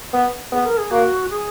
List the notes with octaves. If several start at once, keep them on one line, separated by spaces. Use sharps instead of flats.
B3
B3 G#4
A#4
G#4
A#3 F#4
G#4